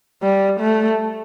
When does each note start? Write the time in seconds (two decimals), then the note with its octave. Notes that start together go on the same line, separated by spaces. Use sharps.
0.23 G3
0.60 A3